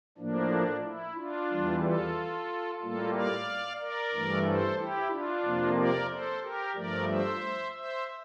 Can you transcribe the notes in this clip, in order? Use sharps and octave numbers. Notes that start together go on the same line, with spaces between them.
A2 F3 A#3 D4
E4
D4 F4
E2 E3 G3
F4 A4
A2 G3 A#3 F4 A4
D5 F5
A#4 D5
G2 E3 A3
A4 C5
E4 G4
D4 F4
F2 C3 F3 A#3
A#4 D5
A4 C5
G4 A#4
G2 F3 A3 A#4 D5
C5 E5
C5 E5